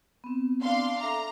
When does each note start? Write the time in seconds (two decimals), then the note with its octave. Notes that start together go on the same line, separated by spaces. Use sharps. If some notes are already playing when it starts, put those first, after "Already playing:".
0.24 B3 C4
0.62 D4 F5 C6
1.00 A4 E5 A#5 D6